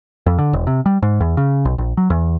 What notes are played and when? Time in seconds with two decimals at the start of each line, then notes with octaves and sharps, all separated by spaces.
0.26 F2
0.38 D3
0.53 E1
0.67 C3
0.86 G3
1.02 G#2
1.20 E2
1.37 C#3
1.65 B1
1.78 A#1
1.97 F#3
2.10 E2